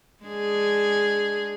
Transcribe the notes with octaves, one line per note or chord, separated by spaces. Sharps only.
G#3 D4 G#4